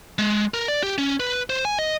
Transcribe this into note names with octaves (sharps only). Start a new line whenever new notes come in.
G#3
A#4
D5
G4
C#4
B4
C5
G#5
D#5